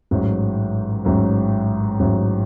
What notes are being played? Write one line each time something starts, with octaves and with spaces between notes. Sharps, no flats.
A1 G#2 F#3
A1 G#2 F#3
A1 G#2 F#3